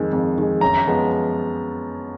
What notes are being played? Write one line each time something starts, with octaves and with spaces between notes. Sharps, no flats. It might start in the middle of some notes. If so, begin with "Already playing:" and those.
Already playing: F2 D#3 G#3
F2
D#3 G#3
F#2 A#5
F3 G#3 B3